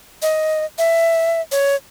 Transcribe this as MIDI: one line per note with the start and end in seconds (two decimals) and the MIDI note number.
0.22 0.65 75
0.78 1.41 76
1.52 1.75 73